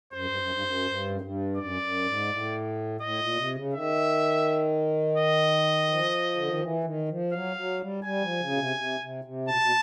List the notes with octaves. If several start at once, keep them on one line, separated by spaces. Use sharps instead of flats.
F#2 C5
G2
F#2
G2
F#2
G2
F#2
G2
F#2 D5
F#2
G#2
A2
A2 D#5
A#2
C3
C#3
D#3 E5
D#5
F3
D3
D#3
E3
D#3
F3
F#3 F5
F#3
G3
G3 G#5
F3
C#3
B2
C3
C3
C3
C3
B2 A5
B2